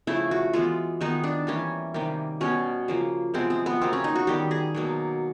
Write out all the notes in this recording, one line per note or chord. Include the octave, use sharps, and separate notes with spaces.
C#3 F3 A3 E4
F#4
E3 G#3 B3 F4
D#3 G#3 B3 D#4
D4
E3 G3 A#3 C#4
C3 D#3 G3 A#3
B2 G3 B3 C#4
C#3 F3 A#3
C3 F3 G#3 B3 C4
C4
B3
C#3 F#3 A#3 C4
C#4
D#4
F#4
D#3 G3 B3 G4
G#4
B2 F#3 A#3